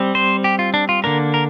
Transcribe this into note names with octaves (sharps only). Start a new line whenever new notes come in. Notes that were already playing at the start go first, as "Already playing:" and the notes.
Already playing: G3 C4
C5
G4
F4
D4
F4
D3 A#3 D4 A#4
A#4